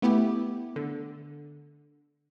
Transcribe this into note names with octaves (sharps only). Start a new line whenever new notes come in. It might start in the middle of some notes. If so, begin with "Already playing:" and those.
A3 B3 E4 G4
D3